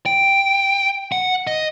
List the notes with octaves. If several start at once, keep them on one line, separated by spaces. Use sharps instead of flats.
G5
F#5
D#5